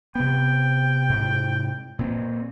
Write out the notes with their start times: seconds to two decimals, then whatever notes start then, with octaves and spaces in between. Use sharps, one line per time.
0.15 C3 B3 G5
1.09 G#2 C3
1.99 A#2 C4